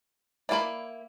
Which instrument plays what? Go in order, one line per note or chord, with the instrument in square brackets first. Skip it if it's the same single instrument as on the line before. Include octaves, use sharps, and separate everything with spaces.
[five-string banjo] A#3 E4 [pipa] D5 F5 B5